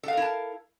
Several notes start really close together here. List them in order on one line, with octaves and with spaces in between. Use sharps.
A4 F5 A#4 E4 A5